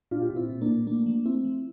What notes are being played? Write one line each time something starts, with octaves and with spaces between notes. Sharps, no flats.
A#2 D4 F4
G4
A#2 F4
C4 E4
A#2
A#3 D4
A#2
A3 A#3 D4
F3
A3 C4 E4
F3